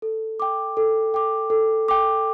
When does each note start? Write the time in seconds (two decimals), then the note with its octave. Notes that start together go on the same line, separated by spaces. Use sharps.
0.02 A4
0.40 G5 D6
0.77 A4
1.14 G5 D6
1.50 A4
1.88 G5 D6